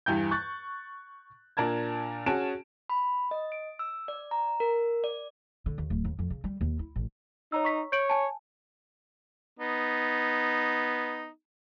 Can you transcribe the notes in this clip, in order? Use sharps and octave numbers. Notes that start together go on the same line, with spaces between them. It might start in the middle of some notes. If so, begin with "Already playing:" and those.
E2 G2 E3 G5 G6
C#6 F#6 A6
A#2 D4 A#4 A5 G#6
C#4 F#4 G#4 A5 D7 E7
B5
D#5
D7
E6
D5
A#5
A#4
D5
D3
D#2
D1
D#2
F2
C#3
G3
D#2
E4
A1
D#4 C#5 A#5 E6
C#6 B6
C#5 G6 D7 F#7
G#5 A5
B3 D#4